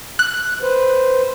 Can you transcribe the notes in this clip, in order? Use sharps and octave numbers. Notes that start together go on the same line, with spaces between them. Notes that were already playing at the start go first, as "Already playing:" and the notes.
F#6
B4 C5